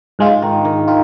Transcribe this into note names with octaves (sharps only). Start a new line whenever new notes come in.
G#2 G#3 F4
D#3
D#3
D#3 F4